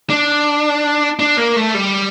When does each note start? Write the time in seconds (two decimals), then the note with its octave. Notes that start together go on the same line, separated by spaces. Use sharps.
0.10 D4
1.19 D4
1.37 A#3
1.56 A3
1.74 G3